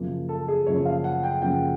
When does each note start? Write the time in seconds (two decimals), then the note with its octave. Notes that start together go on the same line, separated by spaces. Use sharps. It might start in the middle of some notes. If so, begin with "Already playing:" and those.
Already playing: F#2 C#3 F3 A#3
0.29 A4
0.48 G#4
0.66 F#2 C#3 F3 A#3 C#5
0.85 F5
1.04 F#5
1.23 G5
1.42 F#2 C#3 F3 A#3 G5